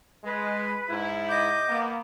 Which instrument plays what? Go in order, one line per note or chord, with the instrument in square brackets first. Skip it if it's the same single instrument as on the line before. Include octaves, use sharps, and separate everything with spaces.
[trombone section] G#3 [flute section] B4
[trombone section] G#2 E4
[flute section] D#5 D6 G6
[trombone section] A#3 B3